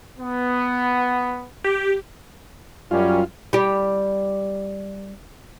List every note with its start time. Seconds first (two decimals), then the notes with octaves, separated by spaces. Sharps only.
0.19 B3
1.64 G4
2.91 F#2 G3 C#4 F4
3.53 G3 G4